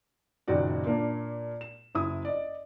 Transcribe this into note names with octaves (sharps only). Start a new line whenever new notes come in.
F#1 A#2 D#3 D#4 F#4 D5
A#2 A#3 D4
E7
F#1 E4 D#6
D5 D#5